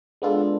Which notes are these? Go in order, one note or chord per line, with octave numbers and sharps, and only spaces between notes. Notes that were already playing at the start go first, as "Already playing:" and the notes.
G#3 B3 D4 F4 A4